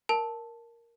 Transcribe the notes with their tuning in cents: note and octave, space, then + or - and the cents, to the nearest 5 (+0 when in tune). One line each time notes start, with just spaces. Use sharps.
A#4 +0 A5 +0